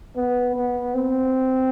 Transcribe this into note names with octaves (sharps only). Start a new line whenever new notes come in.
B3
B3
C4